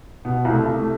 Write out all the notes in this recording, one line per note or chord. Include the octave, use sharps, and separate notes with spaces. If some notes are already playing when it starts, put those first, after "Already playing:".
B2 B3
C2
A3
C2
A3